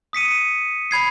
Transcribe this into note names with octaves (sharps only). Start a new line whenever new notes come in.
D#6 B6 C#7 D#7
B5 G#6 C7